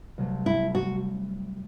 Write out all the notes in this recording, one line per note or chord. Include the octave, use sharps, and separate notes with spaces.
C2 C3 F#3 A3
E4
F#4